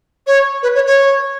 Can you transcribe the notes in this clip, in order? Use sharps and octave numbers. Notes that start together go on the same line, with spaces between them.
C#5
B4
C#5
C#5